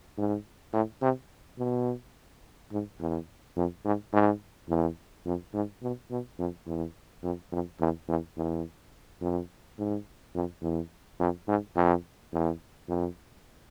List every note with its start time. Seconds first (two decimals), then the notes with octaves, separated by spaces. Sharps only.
0.18 G#2
0.73 A2
1.02 C3
1.58 B2
2.72 G#2
3.00 E2
3.56 F2
3.84 G#2
4.13 G#2
4.69 E2
5.26 F2
5.53 G#2
5.82 B2
6.11 B2
6.39 F2
6.66 E2
7.23 F2
7.52 F2
7.80 E2
8.09 E2
8.37 E2
9.21 F2
9.78 G#2
10.35 F2
10.62 E2
11.20 F2
11.48 G#2
11.76 F2
12.33 E2
12.88 F2